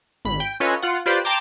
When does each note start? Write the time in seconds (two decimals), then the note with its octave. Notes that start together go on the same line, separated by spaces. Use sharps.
0.25 G#1 B5
0.40 G5
0.60 C#4 F4 A4 B4 C#5 D#5
0.82 F4 F#5
1.06 F4 G4 B4 C5 D5 G5
1.24 G5 A5 A#5 C6 D6 G6